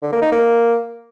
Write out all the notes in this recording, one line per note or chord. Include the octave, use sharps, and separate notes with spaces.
D3
A#3
D#4
A#3